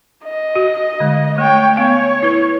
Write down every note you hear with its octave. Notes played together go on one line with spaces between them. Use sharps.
D#5
F#4
D3 G#3
A3 C#5 G5
B3 C#5 F5 G#5
E4 B4